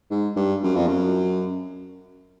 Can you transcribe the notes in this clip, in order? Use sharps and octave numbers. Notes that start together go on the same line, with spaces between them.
G#2
G2
F#2
F2
F#2